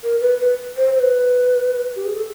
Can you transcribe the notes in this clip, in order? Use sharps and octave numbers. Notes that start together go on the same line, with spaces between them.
A#4
B4
B4
C5
C5
B4
G4
G#4
A4